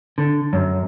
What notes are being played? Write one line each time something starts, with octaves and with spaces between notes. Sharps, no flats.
D3
F#2